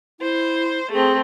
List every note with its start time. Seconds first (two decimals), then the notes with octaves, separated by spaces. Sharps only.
0.20 E4 C5
0.90 A3 C4 G#4